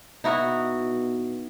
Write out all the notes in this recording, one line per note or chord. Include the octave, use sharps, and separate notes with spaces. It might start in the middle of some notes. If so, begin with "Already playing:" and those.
B2 D#4 E4 F#4